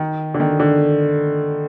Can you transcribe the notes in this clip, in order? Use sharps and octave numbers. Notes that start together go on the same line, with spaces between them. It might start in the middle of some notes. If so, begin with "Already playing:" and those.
Already playing: D#3
D3
D#3
D3